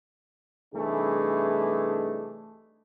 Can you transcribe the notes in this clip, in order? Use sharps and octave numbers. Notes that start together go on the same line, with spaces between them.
C2 E3 A3 D4 D#4 G#4